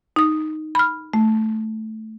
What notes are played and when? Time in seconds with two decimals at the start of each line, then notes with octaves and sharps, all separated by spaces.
0.16 D#4 D#6
0.75 B5 F6
1.13 A3